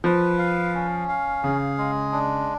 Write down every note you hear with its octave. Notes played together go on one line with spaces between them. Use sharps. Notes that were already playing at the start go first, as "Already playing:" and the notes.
F3 B4
F5
C#4
F5
C#3 G#4
G#3
D4